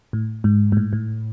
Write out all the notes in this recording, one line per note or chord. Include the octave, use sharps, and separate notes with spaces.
A2
G#2
G#2
A2
A2